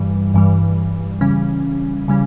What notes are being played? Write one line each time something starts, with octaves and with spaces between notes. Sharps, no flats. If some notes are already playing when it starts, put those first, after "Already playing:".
Already playing: G2 E3 G3
G2 E3 G3
C#3 E3 G3 C#4
C#3 E3 G3 C#4